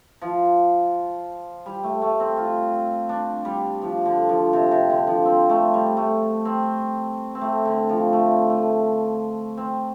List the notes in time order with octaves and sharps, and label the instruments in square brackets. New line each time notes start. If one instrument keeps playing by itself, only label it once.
[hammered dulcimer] F3
G3
A3
A3
C4
F4
D4
G3
F3
D3
F3
C3
C3
D3
F3
C4
A3
G3
A3
C4
C4
A3
D3
F3
A3
A3
C4